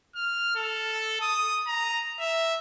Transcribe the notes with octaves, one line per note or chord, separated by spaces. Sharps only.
F6
A4
D#6
A#5
E5